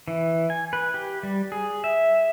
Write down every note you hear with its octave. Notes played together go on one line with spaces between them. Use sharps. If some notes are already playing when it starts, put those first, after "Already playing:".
E3
G#5
B4
G4
G3
G#4
E5